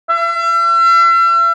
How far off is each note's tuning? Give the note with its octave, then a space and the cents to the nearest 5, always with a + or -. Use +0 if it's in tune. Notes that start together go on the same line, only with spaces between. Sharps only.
E5 +40